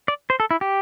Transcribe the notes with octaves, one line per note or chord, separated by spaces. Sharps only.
D5
C5
A4
E4
G4